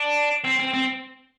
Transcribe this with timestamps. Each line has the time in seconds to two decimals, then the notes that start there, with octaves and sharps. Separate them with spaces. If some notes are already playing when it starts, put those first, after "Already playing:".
Already playing: D4
0.45 C4
0.60 C4
0.74 C4